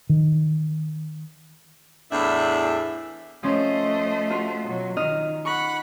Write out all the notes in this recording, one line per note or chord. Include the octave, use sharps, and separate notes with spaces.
D#3
E2 A2 D4 E5
F3 A3 C#4 C5 D#5
F4 F#4
B2 F#3
D#3 D#4 D#5 F6
F#5 B5 C#6 F#6